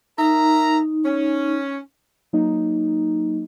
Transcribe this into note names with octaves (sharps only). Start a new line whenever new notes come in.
D#4 A#4 E5 A#5
C#4
F#3 A#3 D#4